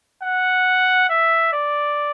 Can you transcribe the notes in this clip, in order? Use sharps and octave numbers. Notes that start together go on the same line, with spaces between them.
F#5
E5
D5